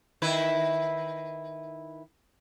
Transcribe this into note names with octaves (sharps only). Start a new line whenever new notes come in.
D#3 E4 B4